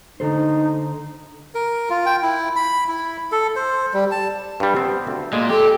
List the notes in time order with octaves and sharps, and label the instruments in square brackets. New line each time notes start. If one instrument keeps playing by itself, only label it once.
[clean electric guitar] D3 A4 C5 [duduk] D#4
[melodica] A#4
F4
G5
E4
B5
E4
A4
C5
G3
A5
[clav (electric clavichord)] G2 G3
B3 C4
D2
[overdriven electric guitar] A#2 [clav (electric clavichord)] G#3
[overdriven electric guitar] G4 [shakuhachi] A4